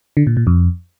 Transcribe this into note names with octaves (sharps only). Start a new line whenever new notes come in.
D3
A#2
A#2
F2